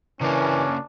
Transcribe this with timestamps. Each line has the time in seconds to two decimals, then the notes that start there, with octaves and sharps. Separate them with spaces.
0.21 C#3 E3 A#3 C#4 D4